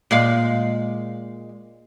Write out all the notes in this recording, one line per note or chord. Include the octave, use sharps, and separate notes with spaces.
A#2 G#3 F5